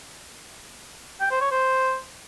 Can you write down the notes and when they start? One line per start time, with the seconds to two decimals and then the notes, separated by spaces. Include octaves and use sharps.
1.20 G5
1.31 C5
1.41 C#5
1.51 C5